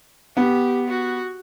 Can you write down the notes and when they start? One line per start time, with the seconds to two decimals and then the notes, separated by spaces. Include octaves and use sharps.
0.37 B3 G4
0.89 F#4